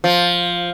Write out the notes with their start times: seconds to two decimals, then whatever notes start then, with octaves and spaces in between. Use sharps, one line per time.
0.04 F3